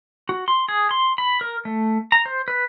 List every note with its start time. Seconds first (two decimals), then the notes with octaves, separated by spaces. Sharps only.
0.29 F#4
0.48 C6
0.68 G#4
0.91 C6
1.18 B5
1.41 A#4
1.65 A3
2.12 A#5
2.26 C5
2.48 B4